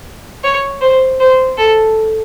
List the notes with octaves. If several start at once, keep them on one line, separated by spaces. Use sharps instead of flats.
C#5
C5
C5
A4